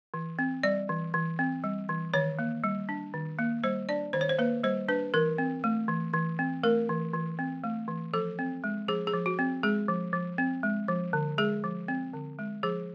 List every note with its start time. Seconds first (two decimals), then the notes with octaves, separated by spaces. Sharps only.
0.14 E3
0.39 C4
0.63 G3 D5
0.89 E3
1.14 E3
1.39 C4
1.64 G3
1.89 E3
2.14 D#3 C#5
2.39 A#3
2.64 G3
2.89 D4
3.14 D#3
3.39 A#3
3.64 G3 C5
3.89 D4 D5
4.13 D#3 C5
4.21 C#5
4.29 C5
4.39 A#3 B4
4.64 G3 C5
4.88 D4 B4
5.14 E3 A#4
5.38 C4
5.64 A3
5.88 E3
6.13 E3
6.39 C4
6.63 A3 A#4
6.89 E3
7.14 E3
7.39 C4
7.64 A3
7.88 E3
8.14 F3 A4
8.39 C4
8.64 G#3
8.88 F3 G#4
9.07 G#4
9.14 F3
9.26 F#4
9.39 C4
9.63 G#3 G#4
9.88 F3
10.13 F3
10.38 C4
10.63 G#3
10.88 F3
11.13 D3
11.38 G#3 G#4
11.64 F3
11.88 C4
12.13 D3
12.39 G#3
12.63 F3 G#4